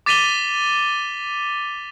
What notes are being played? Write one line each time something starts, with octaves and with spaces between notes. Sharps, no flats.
D6 A6 B6 D#7 F7 G7